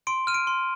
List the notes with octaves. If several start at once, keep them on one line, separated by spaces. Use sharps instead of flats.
C6 D7
F6 D#7
D7
C6